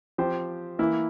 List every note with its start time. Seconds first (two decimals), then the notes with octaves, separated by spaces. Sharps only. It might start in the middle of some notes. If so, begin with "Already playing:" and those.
0.18 F3 C4 G4 C5
0.79 E3 A#3 E4